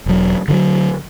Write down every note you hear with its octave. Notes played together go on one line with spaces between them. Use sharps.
E1 F#3
D3 D#3 F#3